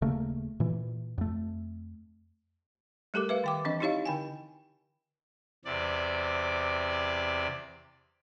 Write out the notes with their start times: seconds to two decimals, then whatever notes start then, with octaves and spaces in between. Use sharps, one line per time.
0.02 D#1 C#3 A3 A#3
0.60 A#2 E3
1.18 F2 A3
3.14 G3 A3 G4 A4 A#4 D6
3.29 B4 E5 F5
3.44 D#3 G5 D6
3.65 E3 C4 D4 D#5
3.80 D#4 E4 G4 C#5 D#5 F5
4.06 D3 G5 G#5
5.65 E2 C3 D5